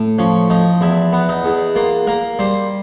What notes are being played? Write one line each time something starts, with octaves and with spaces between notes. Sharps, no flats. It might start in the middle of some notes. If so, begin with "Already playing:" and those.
Already playing: A2
F3 C#4
F3 D#4
E2 E4
B3
D#4
E2
A#3 F4
A#3 A#4
G3 C5